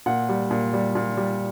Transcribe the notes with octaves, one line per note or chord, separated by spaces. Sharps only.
A#2 F#5
G3
A#2
G3
A#2
G3